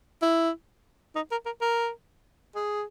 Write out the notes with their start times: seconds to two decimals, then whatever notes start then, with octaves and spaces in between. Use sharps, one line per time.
0.22 E4
1.16 D#4
1.31 A#4
1.46 A#4
1.61 A#4
2.56 G#4